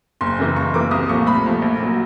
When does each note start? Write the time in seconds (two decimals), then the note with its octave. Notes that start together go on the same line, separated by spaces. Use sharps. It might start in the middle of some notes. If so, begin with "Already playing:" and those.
0.21 F#1 C6
0.39 F#2 C#3 E3
0.56 F#1 C#6
0.74 F#2 C#3 E3 D6
0.91 C2 D#6
1.09 A#2 F3 A3 C#6
1.26 C2 B5
1.45 A#2 F3 A3
1.62 A#1
1.79 A#2 F#3